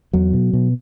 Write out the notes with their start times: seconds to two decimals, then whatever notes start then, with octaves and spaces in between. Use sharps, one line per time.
0.13 E2 F#3
0.33 B2
0.53 B2